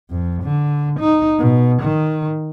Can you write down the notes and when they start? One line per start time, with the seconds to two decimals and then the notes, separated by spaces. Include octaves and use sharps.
0.10 F2
0.43 D3
0.99 D#4
1.39 B2
1.82 D#3